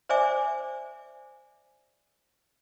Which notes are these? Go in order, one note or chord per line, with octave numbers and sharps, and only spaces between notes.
C5 D5 E5 G#5 D6